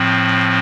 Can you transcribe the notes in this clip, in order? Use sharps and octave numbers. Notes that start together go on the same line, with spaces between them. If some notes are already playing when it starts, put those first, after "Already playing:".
Already playing: A2 F3 C4